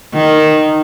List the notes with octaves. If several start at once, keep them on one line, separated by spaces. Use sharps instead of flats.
D#3